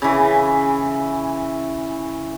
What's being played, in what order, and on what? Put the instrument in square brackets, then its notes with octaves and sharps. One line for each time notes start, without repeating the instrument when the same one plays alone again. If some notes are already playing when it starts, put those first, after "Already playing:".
[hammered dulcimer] C#3 E3